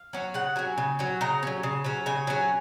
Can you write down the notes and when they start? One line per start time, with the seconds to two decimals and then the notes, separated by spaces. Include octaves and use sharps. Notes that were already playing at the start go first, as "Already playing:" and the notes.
Already playing: F5
0.13 F#3 C#4
0.34 C#3 F#5
0.56 F#3 C#4 G#5
0.78 C#3
0.99 F#3 C#4
1.21 C#3 A#5
1.43 F#3 C#4
1.63 C#3
1.84 F#3 C#4
2.06 C#3 G#5
2.27 F#3 C#4